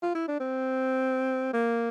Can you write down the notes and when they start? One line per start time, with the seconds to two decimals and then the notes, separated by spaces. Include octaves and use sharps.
0.03 F4
0.15 E4
0.28 D4
0.40 C4
1.53 A#3